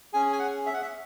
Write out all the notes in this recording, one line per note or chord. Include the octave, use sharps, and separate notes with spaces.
C#4 G#4 G#5
G#5
F#5
E5
F#5
E5